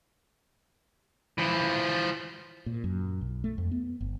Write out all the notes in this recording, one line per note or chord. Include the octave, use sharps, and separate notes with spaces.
E3 F3
A#2
F#2
B1
A3
F2
B3
G1